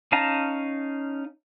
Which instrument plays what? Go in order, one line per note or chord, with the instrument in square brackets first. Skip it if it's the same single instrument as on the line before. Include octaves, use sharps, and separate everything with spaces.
[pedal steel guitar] C#4 D#4 F5 A5 A#5